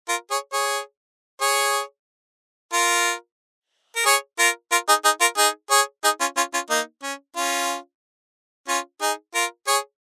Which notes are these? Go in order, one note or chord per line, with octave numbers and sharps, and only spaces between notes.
F4 A#4
G#4 C#5
G#4 C#5
G#4 C#5
F4 A#4
A#4
G#4 C#5
F4 A#4
F4 A#4
D#4 G#4
D#4 G#4
F4 A#4
D#4 G#4
G#4 C#5
D#4 G#4
C#4 F4
C#4 F4
C#4 F4
A#3 D#4
C#4
C#4 F4
C#4 F4
D#4 G#4
F4 A#4
G#4 C#5